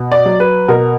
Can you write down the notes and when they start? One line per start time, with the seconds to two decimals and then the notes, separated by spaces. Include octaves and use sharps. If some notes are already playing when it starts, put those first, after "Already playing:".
Already playing: B2
0.12 D5
0.26 F#3
0.40 B4
0.68 B2 A#4